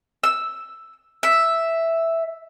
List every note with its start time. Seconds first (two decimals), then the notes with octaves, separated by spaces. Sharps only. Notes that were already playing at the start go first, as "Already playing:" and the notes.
0.23 E6
1.23 E5